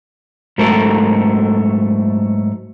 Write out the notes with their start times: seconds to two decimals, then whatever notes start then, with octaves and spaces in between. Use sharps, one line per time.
0.58 G#2 F#3 A3 A4 A#4